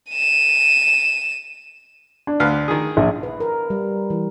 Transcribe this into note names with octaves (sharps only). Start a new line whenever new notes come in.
D#7 E7
D4
D2 B4 F5
D#3 G#4
A#1
B4
A#4
G3
E3